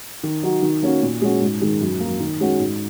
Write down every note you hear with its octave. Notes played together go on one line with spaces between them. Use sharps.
D#3
F#3 D#4 F#4
D#3
A#3 C#4 F#4
A#2
G#3 C#4 F#4
G#2
D#3 G#3
F#2
F#3 A#3
D#3
G#3 C#4 F#4
G#2